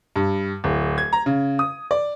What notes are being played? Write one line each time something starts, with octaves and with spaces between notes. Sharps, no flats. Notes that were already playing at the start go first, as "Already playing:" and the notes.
G2
D1
G#6
A#5
C#3
D#6
D5